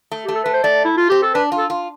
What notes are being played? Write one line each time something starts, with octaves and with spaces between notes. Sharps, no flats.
A3
A3 G4
A4
A3 B4
C5
A3 D5
E4
F4
C4 G4
A4
D4 B4
F4
A4
F4